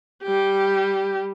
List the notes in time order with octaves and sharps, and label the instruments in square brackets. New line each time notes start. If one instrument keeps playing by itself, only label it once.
[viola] G3 G4